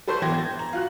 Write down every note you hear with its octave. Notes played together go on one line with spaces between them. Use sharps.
A4 B4 C5 C6 C#6 G6
E3 B3 G5 G#6 A#6
A6
A#5
F4 F#4 F#6